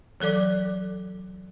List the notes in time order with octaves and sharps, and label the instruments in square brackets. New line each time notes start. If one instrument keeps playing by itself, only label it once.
[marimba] E3 F#3 A4 D5 D6